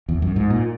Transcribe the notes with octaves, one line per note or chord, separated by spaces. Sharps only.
E2
F#2
G#2
A#2